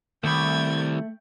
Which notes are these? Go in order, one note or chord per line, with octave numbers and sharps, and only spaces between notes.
C2 D#3 A3 G5 B5 G#6 A6